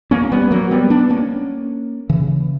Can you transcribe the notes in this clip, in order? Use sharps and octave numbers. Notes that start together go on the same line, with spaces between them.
A#3 C#4
G3 B3
F#3 A#3
G3 B3
B3 D4
A#3 C#4
C#3 E3